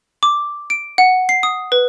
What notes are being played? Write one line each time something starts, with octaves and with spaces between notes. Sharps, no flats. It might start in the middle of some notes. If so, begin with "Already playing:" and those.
D6
D7
F#5
C7
D#6
B4